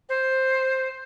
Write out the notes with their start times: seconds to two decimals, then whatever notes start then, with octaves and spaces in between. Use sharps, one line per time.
0.09 C5